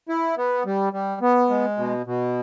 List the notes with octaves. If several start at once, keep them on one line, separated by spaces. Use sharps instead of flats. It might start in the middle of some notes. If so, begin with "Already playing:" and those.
E4
B3
G3
G3
B3
G#3
B2
B2